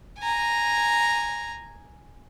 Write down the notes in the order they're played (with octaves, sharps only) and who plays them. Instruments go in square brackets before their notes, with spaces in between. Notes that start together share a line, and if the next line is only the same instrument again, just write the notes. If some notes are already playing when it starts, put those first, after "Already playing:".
[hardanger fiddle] G#5 A#5